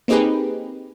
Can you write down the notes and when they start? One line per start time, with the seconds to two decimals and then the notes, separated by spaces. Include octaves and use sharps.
0.08 A#3 C4 D#4 G4 G#4 B4